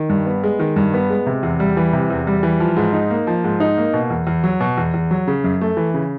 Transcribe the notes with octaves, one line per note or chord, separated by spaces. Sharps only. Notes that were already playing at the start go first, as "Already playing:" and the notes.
Already playing: D#3
G2
B3
G#3
D#3
G2
B3
G#3
C3
E2
G3
E3
C3
E2
G3
E3
F3
G#2
D#4
A#3
F3
G#2
D#4
A#3
B2
E2
E2
F#3
B2
E2
E2
F#3
C#3
F#2
A3
E3
C#3